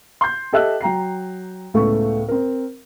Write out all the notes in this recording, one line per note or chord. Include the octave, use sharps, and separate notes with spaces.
C6 G6
G4 A4 D#5 E5 E6 F#6
F#3 G5 A#5 C7
C#2 A2 A3 B3 C#6
C4 A#4